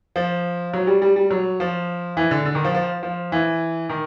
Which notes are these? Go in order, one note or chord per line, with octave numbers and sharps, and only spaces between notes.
F3
F#3
G3
G3
G3
F#3
F3
E3
D3
D3
D#3
F3
F3
F3
E3
D#3